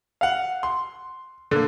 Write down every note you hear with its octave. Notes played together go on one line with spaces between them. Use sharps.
F5 F#5
C6
D3 A#3